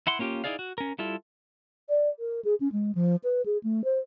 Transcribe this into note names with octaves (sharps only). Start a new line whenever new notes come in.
E4 F#5 C6
A#3 C#4 F4 G4
D#4 E4 G#4 D5 F5
F#4
C#4 A#4
G3 E4 F4 A4
D5
A#4
G#4
C#4
G#3
F3
B4
G#4
A3
C5